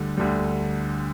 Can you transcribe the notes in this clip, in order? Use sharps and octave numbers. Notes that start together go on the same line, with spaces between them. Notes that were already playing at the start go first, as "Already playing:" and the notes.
Already playing: D2 D3 G3
D2 D3 G3